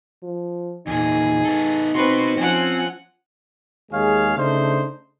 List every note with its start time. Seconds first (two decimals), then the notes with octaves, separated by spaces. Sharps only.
0.23 F3
0.87 E2 A#2 D#4 G#4
1.45 B3 A4
1.95 B3 C4 F#4 B4 C5 C6 C#6
2.37 F3 C4 C#4 F4 F#5 G#5
3.92 D#2 G#3 G#4 C#5 F5
4.37 C#3 A3 D4 D#4 C5